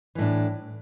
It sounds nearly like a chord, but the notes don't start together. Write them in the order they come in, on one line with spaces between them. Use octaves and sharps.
E3 A2 D4